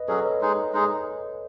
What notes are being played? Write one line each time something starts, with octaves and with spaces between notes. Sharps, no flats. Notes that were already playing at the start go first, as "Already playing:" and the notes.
Already playing: B4 D#5
F#3 C#4 G#4 A4 C#5
B4 D#5
G#3 D#4 G#4
G#3 D#4 G#4